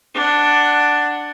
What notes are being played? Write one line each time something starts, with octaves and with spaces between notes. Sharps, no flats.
D4 F#5